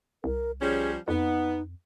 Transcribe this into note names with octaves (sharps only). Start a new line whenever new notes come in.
C2 A#4
F3 G3 C#4 G#4
F2 B3 D#4